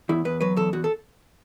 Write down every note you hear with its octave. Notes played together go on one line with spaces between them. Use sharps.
E2 E4
E2 B4
F#3 B4
E2 A4
E2 F#4
A4